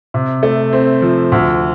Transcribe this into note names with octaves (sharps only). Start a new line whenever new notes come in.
C3
A3
C4
F3
D2